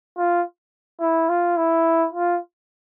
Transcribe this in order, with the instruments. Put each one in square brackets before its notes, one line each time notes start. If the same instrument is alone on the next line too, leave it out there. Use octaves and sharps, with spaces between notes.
[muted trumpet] F4
E4
F4
E4
F4